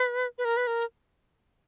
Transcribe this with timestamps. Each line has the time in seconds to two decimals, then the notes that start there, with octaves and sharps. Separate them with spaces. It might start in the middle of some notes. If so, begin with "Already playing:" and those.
Already playing: B4
0.38 B4
0.45 A#4
0.57 B4
0.67 A#4